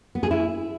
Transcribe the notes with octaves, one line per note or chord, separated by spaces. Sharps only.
B3
G#4
E4